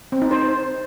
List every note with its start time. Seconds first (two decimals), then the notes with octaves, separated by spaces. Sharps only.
0.12 C4
0.22 D#4
0.31 C5